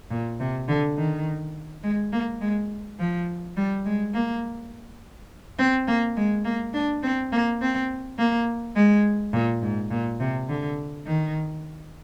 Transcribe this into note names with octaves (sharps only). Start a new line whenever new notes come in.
A#2
C3
D3
D#3
G#3
A#3
G#3
F3
G3
G#3
A#3
C4
A#3
G#3
A#3
D4
C4
A#3
C4
A#3
G#3
A#2
G#2
A#2
C3
D3
D#3